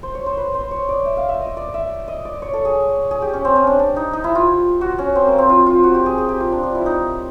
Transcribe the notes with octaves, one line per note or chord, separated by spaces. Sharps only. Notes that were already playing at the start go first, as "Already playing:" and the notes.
C5
C#5
C5
B4
C5
C#5
D5
E5
F5
E5
D#5
D5
E5
D#5
D5
C#5
A4
G#4
G#4
G4
C#4
C4
C#4
D4
D4
D#4
D#4
E4
F4
F#4
C#4
C4
A#3
C4
F4
F4
F#4
G4
G#4
G#4
G4
F4
D4
D4
E4
D#4